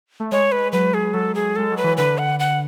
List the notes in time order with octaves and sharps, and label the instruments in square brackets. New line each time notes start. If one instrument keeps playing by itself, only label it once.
[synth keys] A3
[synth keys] G#3 [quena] C#5
[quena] B4
[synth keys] F#3 [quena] B4
[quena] G#4
[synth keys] F#3 [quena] A4
[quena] G#4
[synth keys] G#3 [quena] A4
[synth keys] F#3
[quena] B4
[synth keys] E3
[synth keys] D3 [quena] B4
[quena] F#5
F#5